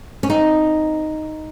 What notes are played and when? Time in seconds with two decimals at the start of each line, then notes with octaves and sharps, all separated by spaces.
0.23 C#4
0.29 C4 D#4